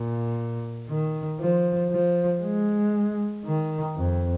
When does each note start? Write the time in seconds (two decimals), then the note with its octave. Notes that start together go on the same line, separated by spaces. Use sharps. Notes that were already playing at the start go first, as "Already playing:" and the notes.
Already playing: A#2
0.89 D#3
1.40 F3
1.91 F3
2.42 G#3
3.45 D#3
3.96 F2